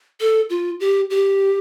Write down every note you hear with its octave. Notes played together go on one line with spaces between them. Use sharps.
A4
F4
G4
G4